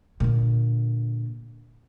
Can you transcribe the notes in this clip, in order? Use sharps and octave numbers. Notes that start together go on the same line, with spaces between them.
A#2 D3